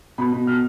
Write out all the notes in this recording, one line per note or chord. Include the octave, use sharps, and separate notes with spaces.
B2 B5
B2
B2 F6